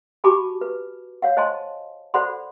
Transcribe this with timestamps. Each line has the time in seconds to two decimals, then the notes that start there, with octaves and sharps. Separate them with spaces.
0.24 F#4 G4 G#5 A5 B5 D6
0.61 B4
1.22 C#5 F5 F#5
1.37 C5 D#5 G#5 A5 C6
2.14 A4 C5 D5 F#5 B5 C6